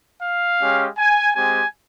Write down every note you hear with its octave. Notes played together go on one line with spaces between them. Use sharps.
F5
G#3 C#4 G4
G#5
G#3 C4 G4 G#5